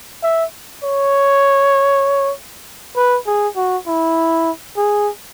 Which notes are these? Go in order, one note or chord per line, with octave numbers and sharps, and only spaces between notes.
E5
C#5
B4
G#4
F#4
E4
G#4